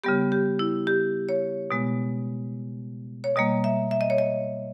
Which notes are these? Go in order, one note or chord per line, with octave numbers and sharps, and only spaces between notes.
C#3 G3 B3 G4
G4
E4
G4
C#5
B2 G#3 B3
C#5
B2 G3 A#3 D#5
E5
E5
D#5
C#5
D#5